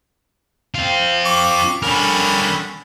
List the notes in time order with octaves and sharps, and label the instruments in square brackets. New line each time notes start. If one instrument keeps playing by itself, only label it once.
[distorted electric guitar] C4 F4
[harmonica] C#6 D6
[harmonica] D3 C#4 B5 [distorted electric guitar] G3 A#4